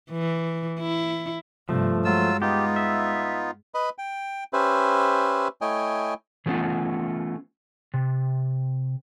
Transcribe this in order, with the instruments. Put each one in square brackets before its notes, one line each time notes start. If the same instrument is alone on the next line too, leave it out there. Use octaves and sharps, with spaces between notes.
[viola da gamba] E3
E4
[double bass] G2 C3 [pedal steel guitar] F3 A3
[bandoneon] F#3 F4 E6 [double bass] G#3
[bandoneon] B3 D#4 F4 [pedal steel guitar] G4
[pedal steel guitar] E5
[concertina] B4 D#5 B5
G5
C#4 G4 B4 C5 E5
A3 E4 C#5 D#5 G5 G#5
[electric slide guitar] E3 F#3 A3 B3 C#4 F4
C3